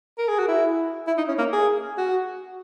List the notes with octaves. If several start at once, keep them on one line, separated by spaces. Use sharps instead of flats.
A#4
G#4
F#4
E4
E4
D#4
C#4
A#3
G#4
F#4